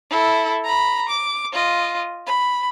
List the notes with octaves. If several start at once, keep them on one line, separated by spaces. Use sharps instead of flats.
E4 A4
A#5 B5
D6
F4 D#5
B5